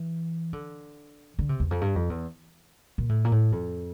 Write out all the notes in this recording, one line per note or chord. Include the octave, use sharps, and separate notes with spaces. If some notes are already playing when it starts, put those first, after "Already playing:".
Already playing: E3
D3
D3
C3
E2
F2
G2
F2
E2
A#2
A2
A#2
A2
F2